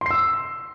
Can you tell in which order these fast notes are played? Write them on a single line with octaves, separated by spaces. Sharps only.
C6 C7 E6